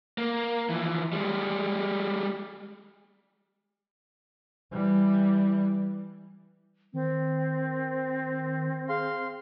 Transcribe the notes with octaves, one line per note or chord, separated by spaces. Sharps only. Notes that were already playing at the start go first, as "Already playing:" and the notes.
A#3
E3 F3
G3 G#3
E3 G3
D#3 C4
G#4 F5 C6